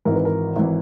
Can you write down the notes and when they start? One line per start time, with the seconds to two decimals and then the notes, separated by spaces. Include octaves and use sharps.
0.05 G#1 G#2 E3 A#4
0.15 B4
0.25 A#4
0.56 G#1 E3